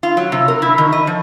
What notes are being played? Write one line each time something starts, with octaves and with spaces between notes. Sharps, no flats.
F4
F#3
C3
A#4
E4
D#3
D#5
F3